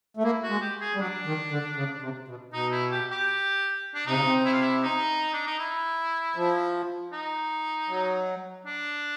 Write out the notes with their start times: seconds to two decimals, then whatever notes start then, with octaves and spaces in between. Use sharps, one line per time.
0.17 A3
0.23 A#3 E4
0.43 F#4
0.50 G#3
0.61 G4
0.81 G#4
0.95 G3
1.00 F#3 D4
1.26 D#3
1.51 D3
1.76 C#3
2.02 C3
2.28 B2
2.53 B2 D#4
2.72 E4
2.91 G4
3.11 G4
3.94 D4
4.06 C3 D#4
4.14 C#3
4.22 C3
4.45 E4
4.53 F4
4.61 E4
4.83 D#4
5.33 D4
5.46 D#4
5.59 E4
6.36 F3
7.12 D#4
7.89 F#3
8.66 D4